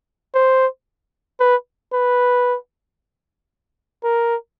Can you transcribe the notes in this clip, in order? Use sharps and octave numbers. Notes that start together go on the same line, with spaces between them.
C5
B4
B4
A#4